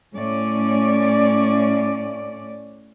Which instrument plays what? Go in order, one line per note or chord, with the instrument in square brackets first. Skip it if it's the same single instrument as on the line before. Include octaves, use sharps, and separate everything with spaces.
[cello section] A2 C#4 D5